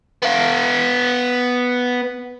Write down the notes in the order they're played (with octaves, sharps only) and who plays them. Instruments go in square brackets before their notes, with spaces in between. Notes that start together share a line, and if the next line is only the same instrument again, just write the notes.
[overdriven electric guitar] B3 F5